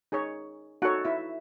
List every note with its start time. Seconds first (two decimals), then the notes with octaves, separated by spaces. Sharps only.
0.12 D#4 G#4 C#5
0.82 D#4 F#4 A4 C#5 F#5
1.05 E4 E5